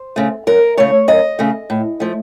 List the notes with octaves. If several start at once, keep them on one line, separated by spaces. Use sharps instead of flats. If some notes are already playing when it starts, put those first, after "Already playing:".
Already playing: C5
C#3 A3
F#2 A#4
C#3 A3 C#5
F#2 D#5
C#3 A3
A2
F3 A3